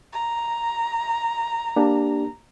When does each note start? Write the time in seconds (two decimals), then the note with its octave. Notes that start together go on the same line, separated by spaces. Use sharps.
0.12 A#5
1.76 A#3 D4 G4